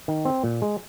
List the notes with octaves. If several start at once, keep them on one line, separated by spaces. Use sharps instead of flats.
D#3
C4
A#2
G#3